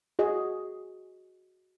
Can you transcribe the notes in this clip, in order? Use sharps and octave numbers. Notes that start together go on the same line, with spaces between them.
F#4 G#4 D#5